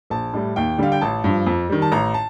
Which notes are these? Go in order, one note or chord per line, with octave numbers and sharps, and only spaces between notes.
A#1 A5
A2 G3
D#2 G5
D3 G3 F5
G5
A1 A5
G2 F3
F2
D#3 G3
A5
A1 A#5
A5